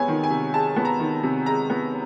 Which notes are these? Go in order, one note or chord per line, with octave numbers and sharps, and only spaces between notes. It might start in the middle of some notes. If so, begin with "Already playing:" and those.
Already playing: C3 G#3 B3 C#5 G#5
D#3
G#5
C3
G#3 A5
B3
A#5
D#3
C3
G#3 A#5
B3